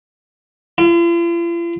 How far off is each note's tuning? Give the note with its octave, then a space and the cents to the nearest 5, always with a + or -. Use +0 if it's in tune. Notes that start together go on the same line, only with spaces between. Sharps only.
F4 -45